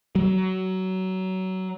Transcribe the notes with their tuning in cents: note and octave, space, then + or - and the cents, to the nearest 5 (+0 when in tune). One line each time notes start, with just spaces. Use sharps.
F#3 +20